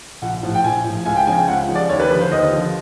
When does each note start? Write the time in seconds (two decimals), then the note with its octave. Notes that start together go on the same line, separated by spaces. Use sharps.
0.22 A#1 F#5
0.43 A2 F3
0.54 G5
0.64 A#1 G#5
0.84 A2 F3
1.05 C#2 G#5
1.16 G5
1.27 C#3 F3 G#5
1.37 G5
1.48 C#2 F#5
1.68 C#3 F3
1.75 D5
1.89 D#2 C#5
2.00 B4
2.10 D3 F3 B4
2.21 C5
2.31 D#2 D#5
2.52 D3 F3